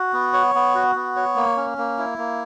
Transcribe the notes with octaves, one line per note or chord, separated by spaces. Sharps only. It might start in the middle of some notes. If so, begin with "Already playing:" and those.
Already playing: F#4
B3
C#5
B3
F#4
B3
C#5
A#3
C#4
A#3
E4
A#3